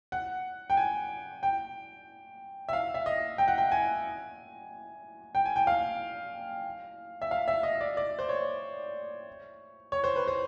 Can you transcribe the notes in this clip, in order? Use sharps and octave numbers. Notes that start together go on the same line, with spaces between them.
F#5
G5
G#5
G5
E5
F5
E5
D#5
G5
F#5
G5
G#5
G5
G#5
G5
F5
E5
F5
E5
D#5
D5
D5
C5
C#5
C#5
C5
B4
C5